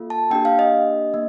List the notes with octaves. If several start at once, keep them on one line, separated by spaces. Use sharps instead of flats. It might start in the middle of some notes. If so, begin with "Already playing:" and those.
Already playing: A#3 F4 A4
A5
A#3 D4 G4 G5
F5
D#5
A#3